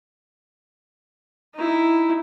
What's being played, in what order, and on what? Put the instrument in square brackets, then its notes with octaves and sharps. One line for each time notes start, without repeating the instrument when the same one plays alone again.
[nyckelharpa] D#4 E4